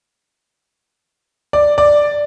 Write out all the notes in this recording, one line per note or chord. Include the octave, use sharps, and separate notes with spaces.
D5
D5